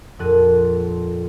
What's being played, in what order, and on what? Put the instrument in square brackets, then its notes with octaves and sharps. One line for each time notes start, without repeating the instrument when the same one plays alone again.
[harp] A#1 F2 A#4 F#6 A6 D#7